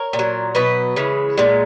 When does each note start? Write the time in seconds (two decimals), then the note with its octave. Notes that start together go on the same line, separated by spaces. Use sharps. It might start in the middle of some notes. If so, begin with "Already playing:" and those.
Already playing: A#4 C#5
0.13 A#2
0.19 F#3
0.55 B2 F#3 B4 D#5
0.96 C#3 E3 G#3
1.37 A#2 G#3